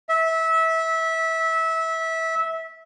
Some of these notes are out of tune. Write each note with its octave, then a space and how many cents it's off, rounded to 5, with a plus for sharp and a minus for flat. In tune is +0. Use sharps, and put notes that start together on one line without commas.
E5 -20